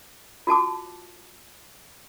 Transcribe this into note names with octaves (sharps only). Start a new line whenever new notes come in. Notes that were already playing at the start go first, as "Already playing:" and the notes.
F4 F#4 A5 D6